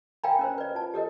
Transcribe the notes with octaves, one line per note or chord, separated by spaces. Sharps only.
A#4 F5 G5 G#5 A#5 B5
C#4 A#4 C5
B4 D5
F4 A5
G4 A4 A#4 D#5